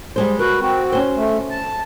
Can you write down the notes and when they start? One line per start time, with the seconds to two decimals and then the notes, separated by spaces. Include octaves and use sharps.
0.16 G3 G#3 C5
0.39 F#4 A#4 B4
0.60 C4 F#4
0.92 C#4 C5
1.16 A3
1.51 A5